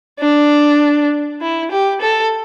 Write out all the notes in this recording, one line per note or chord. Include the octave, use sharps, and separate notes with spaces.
D4
E4
G4
A4